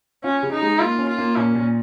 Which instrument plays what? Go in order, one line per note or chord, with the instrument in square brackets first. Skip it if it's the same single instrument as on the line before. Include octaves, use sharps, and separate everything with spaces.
[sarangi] C#4 [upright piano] F4
[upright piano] C#3
[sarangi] D#4
[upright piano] G#3
[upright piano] A#3 [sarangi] F4
[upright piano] C#4
[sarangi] F4
[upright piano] A#3
[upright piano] A#2 [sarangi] C#4
[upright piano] A#2